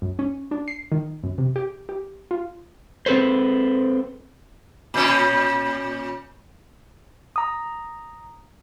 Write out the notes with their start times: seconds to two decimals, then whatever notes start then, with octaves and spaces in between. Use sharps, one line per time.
0.02 F#2
0.19 C#4
0.51 D4
0.68 C7
0.92 D#3
1.24 F#2
1.38 C3
1.56 G4
1.89 G4
2.31 F4
3.06 C4 G#4 A4 B4 C5
4.94 A#2 C#4
7.36 A#5 D#6